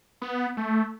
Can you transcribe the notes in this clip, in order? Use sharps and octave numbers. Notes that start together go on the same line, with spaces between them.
B3
A3